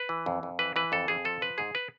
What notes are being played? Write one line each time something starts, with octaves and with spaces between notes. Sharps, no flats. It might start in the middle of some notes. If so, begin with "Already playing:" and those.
Already playing: B4
E3
F2
F2
E3 B4
E3 B4
F2 A4
F2 G#4
F3 A4
F3 B4
G#2 G#4
B4